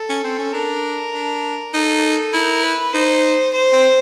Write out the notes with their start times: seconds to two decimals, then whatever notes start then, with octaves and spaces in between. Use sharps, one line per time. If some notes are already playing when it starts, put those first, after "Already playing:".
Already playing: A4
0.09 C#4
0.24 C4
0.39 C#4
0.53 D4 A#4
1.14 D4
1.74 D#4 A4
2.33 E4 A#4
2.63 B4
2.93 D#4 C5
3.54 C5
3.73 C4